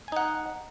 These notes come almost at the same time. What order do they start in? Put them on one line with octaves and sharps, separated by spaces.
G#5 D#4 F#5